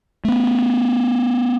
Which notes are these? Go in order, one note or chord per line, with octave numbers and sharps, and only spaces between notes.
A3 B3